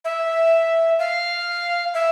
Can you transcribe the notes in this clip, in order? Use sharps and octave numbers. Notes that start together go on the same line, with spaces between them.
E5
F5
E5